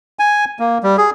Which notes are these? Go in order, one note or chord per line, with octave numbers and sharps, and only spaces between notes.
G#5
A#3
G3
G#4